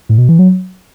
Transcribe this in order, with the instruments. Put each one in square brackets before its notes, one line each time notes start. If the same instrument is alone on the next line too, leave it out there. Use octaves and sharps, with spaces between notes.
[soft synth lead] A2
B2
E3
F#3